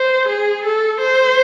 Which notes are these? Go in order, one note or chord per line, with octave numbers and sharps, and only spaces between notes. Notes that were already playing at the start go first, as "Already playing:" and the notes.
Already playing: C5
G#4
A4
C5